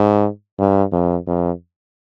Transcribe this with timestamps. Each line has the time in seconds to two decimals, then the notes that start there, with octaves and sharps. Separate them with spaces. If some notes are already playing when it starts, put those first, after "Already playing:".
Already playing: G#2
0.59 G2
0.92 F2
1.27 F2